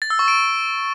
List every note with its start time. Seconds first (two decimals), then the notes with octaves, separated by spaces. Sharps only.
0.02 A6
0.10 E6
0.19 C#6
0.28 D7